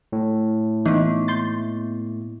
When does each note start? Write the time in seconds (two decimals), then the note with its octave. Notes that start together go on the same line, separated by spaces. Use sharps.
0.12 A2
0.86 E3 A#3 B3 D#4
1.28 C6 G6 A6